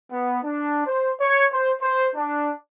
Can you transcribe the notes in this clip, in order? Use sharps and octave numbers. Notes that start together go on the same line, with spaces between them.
B3
D4
C5
C#5
C5
C5
D4